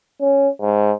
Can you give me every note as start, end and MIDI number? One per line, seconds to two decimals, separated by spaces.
0.21 0.48 61
0.61 0.93 44